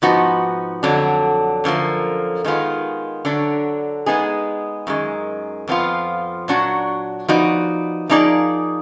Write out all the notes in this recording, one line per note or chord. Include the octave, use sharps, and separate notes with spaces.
G#2 F3 B3 D#4 F#4
F2 D3 F#3 D4
F#2 D3 F3 A#3
D#3 G#3 B3 F4
D3 F#3 D4
G#3 B3 D#4 G#4
F#2 D#3 G#3
F2 F3 B3 F4
A#2 F#3 D4 F#4
F3 B3 D#4 F#4 D5
F3 A#3 D#4 G#4 D5